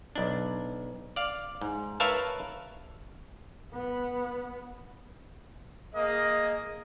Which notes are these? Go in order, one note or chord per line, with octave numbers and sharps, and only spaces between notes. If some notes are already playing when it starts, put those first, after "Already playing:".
B1 D4
D5 F5
G#2
A#4 B4 C#5 E5 F5 A5
B3
A#3 G#4 D#5